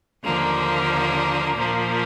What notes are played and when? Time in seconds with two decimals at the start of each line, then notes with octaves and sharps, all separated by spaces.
0.24 D#2 D3 F3 A#3
1.56 A#2 F3 A#3